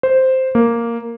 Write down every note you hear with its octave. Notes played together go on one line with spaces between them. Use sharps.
C5
A#3